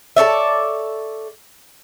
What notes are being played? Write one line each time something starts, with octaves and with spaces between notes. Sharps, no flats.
A4 C#5 D5 E5